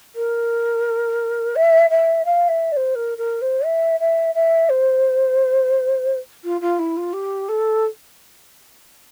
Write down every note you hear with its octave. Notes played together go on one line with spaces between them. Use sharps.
A#4
E5
E5
F5
E5
D5
C5
A#4
A#4
C5
E5
E5
E5
C5
F4
F4
E4
F4
G4
A4